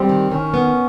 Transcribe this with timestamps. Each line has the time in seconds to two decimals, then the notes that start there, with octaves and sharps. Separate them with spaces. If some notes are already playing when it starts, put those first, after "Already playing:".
Already playing: G3 C4
0.09 D#3
0.31 D#3 C#4
0.54 B3